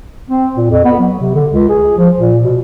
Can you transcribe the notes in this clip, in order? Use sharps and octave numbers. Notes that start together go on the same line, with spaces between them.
C4
A#2
F2
B3
F#3
C3
D3
C#2
G#4
F3
A#2
B2